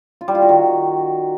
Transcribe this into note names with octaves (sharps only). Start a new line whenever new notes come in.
F4
G3
F4
F#4
D#3